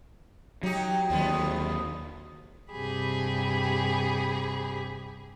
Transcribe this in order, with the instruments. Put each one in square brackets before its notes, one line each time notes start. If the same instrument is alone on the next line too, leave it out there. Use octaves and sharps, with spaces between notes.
[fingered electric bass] F#3 [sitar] D#4 G4
[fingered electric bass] D#2 F#3 [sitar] D3 F3 B3
[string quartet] G2 C3 G4 G#4 B5